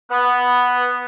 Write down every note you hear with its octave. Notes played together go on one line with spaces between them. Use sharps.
B3